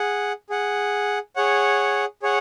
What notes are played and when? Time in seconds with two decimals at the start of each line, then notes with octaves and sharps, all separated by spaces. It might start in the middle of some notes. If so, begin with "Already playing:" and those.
Already playing: G#4 F#5
0.50 G#4 F#5
1.36 G#4 C#5 F#5
2.23 G#4 C#5 F#5